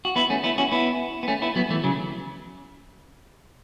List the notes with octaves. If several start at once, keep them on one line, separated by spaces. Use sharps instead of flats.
F#4
B3 E4
A3 C#4
B3 E4
C#4 F#4
B3 E4
B3
A3 C#4
B3 E4
F#3 B3
E3 A3
C#3 F#3